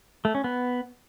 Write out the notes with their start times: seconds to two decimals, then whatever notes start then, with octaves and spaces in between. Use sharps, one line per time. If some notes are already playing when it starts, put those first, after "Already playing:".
0.25 A3
0.35 C#4
0.44 B3